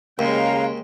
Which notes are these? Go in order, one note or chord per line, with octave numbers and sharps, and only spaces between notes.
D#2 C#3 G#3 F5 G5 A#5